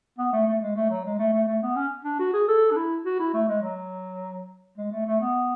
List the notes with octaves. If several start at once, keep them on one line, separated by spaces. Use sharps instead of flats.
B3
A3
A3
G#3
A3
F#3
G#3
A3
A3
A3
B3
C#4
D4
F#4
G#4
A4
D4
E4
F#4
E4
A3
G#3
F#3
G#3
A3
A3
B3